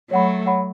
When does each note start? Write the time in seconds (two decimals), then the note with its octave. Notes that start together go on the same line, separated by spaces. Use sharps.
0.11 F#3 A3 C#5 F#5 B5
0.46 C#5 F#5 B5